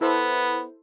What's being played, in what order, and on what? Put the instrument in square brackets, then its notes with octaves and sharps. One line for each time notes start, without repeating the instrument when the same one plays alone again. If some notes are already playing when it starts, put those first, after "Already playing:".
[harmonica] B3 [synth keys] E4 A4 C5